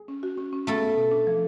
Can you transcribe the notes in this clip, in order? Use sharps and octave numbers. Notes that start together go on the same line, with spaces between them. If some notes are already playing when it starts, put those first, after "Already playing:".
Already playing: G#4
C#4
F#4
C#4
C#4
A3 B3 A4
B3
B2
D4
F3